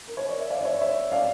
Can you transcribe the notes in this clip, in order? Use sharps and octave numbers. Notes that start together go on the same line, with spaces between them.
A#4
C#5
D5
E5
D5 F5
D5
C#5 E5
C#5 E5
D5 F5